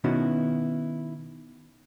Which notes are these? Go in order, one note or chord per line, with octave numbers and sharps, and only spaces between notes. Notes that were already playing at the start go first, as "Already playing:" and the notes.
B2 D#3 B3 C#4 E4 F#4